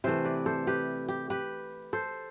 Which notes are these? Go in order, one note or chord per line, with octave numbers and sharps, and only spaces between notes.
C3 E3 A3 C5 E5
B4 D5
A4 C5
G4 B4
G4
G4 B4
A4 C5